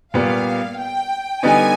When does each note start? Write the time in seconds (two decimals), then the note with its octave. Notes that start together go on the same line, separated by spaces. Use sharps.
0.14 A#2 G3 B3 F5
0.78 G5
1.43 D3 G3 B3 D#4 G#5